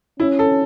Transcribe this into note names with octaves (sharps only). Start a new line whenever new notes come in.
C#4 E4
A4